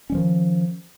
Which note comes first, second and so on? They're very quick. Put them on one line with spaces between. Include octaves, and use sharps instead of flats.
C#4 G3 F3 D#3